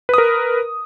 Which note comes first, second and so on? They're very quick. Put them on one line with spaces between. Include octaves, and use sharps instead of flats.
B4 D#6 A#4